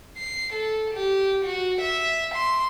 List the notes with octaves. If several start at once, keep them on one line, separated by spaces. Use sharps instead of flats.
C7
A4
G4
F#4
E5
C6